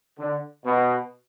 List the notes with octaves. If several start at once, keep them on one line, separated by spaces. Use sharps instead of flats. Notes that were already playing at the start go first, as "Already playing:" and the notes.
D3
B2